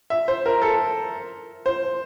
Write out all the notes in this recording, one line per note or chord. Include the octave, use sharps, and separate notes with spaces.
E5
C5
A#4
A4
C5